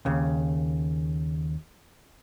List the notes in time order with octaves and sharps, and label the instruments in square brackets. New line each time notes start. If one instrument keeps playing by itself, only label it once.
[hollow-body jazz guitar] D#2 C#3